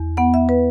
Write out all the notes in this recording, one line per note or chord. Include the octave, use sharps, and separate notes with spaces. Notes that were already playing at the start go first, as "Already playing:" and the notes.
Already playing: E2
B3 F#5
E5
B4